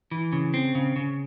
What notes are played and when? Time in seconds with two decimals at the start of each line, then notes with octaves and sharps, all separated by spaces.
0.11 E3
0.32 C#3
0.54 C4
0.75 C#3
0.96 C#3